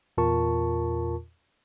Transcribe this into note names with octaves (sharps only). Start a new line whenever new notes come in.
E2 A#2 F4 A#4 A5 C#6